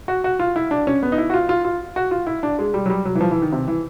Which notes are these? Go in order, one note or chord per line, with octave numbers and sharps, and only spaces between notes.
F#4
F#4
F4
E4
D4
C#4
B3
D#4
E4
F#4
F4
F4
F4
F#4
F4
E4
D4
G#3
G3
F#3
G3
F#3
E3
F3
E3
D#3
C3
E3